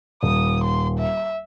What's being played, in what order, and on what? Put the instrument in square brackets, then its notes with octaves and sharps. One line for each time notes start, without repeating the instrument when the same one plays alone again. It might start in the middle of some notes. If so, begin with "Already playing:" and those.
[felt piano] D#1 [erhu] D#6
[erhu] C6
E5